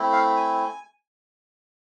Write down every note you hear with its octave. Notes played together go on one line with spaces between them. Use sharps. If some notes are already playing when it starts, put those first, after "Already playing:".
Already playing: A3 C4 E4
F5
G#5